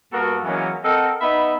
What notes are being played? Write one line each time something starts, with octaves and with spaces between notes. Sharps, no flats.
G2 A#3 B3 F#4 A4 A#4
E3 F#3 G#3 A#3 B3 C#4
C4 A4 A#4 D#5 F#5
B3 D#4 E5 B5